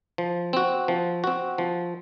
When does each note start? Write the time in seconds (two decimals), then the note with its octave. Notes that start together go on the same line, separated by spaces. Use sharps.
0.18 F3
0.53 C4 F#4
0.88 F3
1.24 C4 F#4
1.58 F3